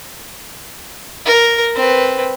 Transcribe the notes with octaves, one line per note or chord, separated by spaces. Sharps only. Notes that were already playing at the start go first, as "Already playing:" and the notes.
A#4
C4 B4